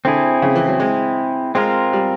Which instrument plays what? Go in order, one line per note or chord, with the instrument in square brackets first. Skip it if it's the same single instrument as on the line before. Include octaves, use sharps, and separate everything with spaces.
[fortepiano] D3 [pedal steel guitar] C4 E4 G#4
[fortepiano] C#3
E3
F#3
G#3
[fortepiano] G#3 [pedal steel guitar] C4 F4 A#4
[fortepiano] G3